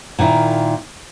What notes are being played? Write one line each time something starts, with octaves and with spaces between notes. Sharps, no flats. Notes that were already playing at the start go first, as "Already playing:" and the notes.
A#2 D#3 A#3 E4